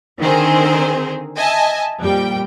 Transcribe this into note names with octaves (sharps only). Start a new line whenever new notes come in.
D3 D#3 C4 G#4 A#4 C5
D#5 E5 G#5 A5
F2 A#2 G3 G5